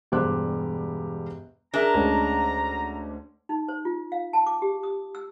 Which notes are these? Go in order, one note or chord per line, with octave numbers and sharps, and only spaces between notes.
E1 G2 G4 C5 F#6
D4 G#4 A#4 E5 A#5
D2 G#3 C#4
D#4
C5
F4
F5
A5
D6
G4
D#6
E6